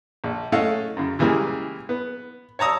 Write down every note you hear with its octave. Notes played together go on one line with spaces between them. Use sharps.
A#1
A3 C#4 D#5 F5 F#5
F#2 C#3
C#3 E3 G3 G#3 A#3
B3
C#5 A5 A#5 D#6 E6